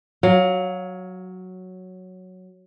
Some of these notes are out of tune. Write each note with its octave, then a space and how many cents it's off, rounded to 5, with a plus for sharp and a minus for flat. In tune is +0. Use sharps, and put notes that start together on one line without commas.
F#3 +0 F5 +25